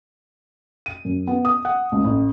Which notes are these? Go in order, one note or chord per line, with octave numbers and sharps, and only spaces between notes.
D#7
F#2
B3
D#6
F#5
C#2
A1